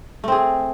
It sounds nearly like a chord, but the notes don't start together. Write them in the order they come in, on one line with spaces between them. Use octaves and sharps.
A3 C4 G#4